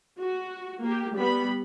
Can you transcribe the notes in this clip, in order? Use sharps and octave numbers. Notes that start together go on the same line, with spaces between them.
F#4
A#3 G4
G3 B3 B5